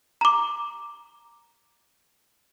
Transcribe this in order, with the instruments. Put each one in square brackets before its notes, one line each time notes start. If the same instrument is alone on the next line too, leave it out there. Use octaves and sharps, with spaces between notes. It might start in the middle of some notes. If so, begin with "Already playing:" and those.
[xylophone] A#5 D6